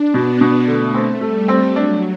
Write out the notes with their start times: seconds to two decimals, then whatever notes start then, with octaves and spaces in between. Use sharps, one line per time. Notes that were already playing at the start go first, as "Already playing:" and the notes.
Already playing: D4
0.14 B2 B3
0.41 B2
0.67 D3 A3
0.94 C4
1.21 G3 A3
1.48 C4
1.76 F#3 D4